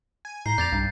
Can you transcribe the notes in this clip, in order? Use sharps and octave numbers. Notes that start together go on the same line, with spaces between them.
G#5
A2 A#5 G6 C7
F2 D5 G6 A6 F7
C2 G2